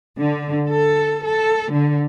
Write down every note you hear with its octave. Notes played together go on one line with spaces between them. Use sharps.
D3
A4
A4
D3